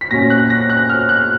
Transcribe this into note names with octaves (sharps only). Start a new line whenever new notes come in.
B6
A#2 F#3 C#4 A#6
F#6
A#6
F#6
F6
F#6